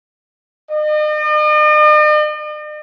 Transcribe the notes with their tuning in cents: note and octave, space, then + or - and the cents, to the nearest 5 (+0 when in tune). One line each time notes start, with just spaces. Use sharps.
D#5 -45